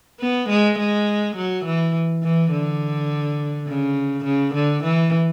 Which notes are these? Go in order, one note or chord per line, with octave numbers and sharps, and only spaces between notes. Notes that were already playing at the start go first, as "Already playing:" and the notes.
B3
G#3
G#3
F#3
E3
E3
D3
C#3
C#3
D3
E3